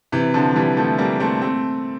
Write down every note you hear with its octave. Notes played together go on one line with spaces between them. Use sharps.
C3 E3
D3 F3
E3 G3
F3 A3
G3 A#3
A3 C4
A3 C4